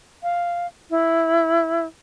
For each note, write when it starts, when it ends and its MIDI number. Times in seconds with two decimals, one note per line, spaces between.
0.23 0.67 77
0.90 1.86 64